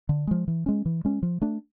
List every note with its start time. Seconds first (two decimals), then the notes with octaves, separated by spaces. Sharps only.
0.09 D3
0.27 F3 G#3
0.48 E3
0.66 G#3 C#4
0.86 E3
1.05 G#3 C#4
1.23 F3
1.42 A3 D4